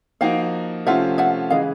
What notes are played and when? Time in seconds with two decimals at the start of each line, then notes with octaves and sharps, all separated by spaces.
0.21 F3 A#3 D#4 F#4 F5 G5
0.86 C3 F3 A3 C#4 F4 E5 F#5
1.18 E5 F#5
1.50 C#3 E3 G#3 D#5 F5